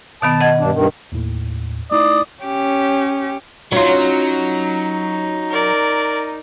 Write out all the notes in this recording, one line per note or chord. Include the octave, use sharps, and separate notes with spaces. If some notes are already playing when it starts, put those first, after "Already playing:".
B2 D#3 B3 A5
D#5 F#5 G#6
G2 D4
G2 D#3
D#2 A2
A3 D#4 E4 D5 D#6
C#4 G4
F#3 C#4 D#4 F4
A#4 D5